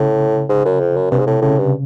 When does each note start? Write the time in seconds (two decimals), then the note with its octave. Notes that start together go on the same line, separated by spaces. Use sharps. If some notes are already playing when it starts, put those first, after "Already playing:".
Already playing: A2 C#3
0.49 G#2
0.65 F#2
0.80 F2
0.96 F#2
1.11 G2 C3
1.19 G#2
1.27 A2
1.42 A2 C#3
1.58 G2